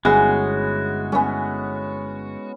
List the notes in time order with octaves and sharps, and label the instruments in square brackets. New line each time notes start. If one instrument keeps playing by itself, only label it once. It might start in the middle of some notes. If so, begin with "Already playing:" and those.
[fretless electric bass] G1 [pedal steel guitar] G#3 F#4 [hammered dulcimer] B3 C#4 E4 [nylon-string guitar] G#4
[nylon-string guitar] A3 [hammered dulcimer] B3 C#4